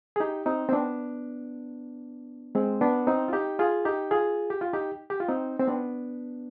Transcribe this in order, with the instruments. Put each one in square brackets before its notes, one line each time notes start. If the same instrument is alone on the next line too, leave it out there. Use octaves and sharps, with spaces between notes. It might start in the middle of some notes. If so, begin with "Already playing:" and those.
[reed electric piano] G#4
D#4 G4
C4 D#4
C4
B3 D4
G#3 C4
B3 D4
C4 D#4
F4
D#4 G4
F4 G#4
D#4 G4
F4 G#4
G4
F4
D#4 G4
G4
F4
C4 D#4
C4
B3 D4